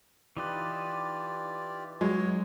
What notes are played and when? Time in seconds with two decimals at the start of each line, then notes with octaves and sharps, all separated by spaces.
0.37 E3 D#4 F4 G4 B4 D5
2.01 F#3 G#3 C#5